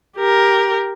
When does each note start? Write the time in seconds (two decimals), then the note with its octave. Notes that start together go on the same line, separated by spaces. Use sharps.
0.17 G4 A#4